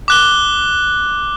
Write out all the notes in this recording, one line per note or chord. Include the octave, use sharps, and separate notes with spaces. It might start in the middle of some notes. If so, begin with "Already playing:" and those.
D6 F#6 G7